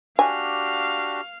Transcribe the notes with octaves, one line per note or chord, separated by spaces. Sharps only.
D4 F#4 G4 F5 G#5